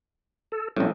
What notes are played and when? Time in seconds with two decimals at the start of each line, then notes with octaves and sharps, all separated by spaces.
0.52 A4
0.76 A#1 A2 G3 C4 C#4